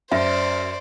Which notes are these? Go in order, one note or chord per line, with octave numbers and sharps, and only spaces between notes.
F#2 C5 D5 E5